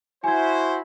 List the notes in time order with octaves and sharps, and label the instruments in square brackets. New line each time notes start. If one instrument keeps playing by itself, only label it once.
[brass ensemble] E4 F#4 C5 [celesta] G#5 G#6